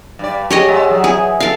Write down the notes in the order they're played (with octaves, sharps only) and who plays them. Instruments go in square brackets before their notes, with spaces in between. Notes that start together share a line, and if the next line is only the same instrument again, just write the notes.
[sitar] G2 D5
[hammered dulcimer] C#3 F#5 [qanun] G4 C#5 D#5 [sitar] G#4
[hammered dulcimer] D3 E5 A#5 [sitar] G#3
[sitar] F#3 [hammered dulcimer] G#4
[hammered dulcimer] E3 [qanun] G#4
[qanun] A4 F5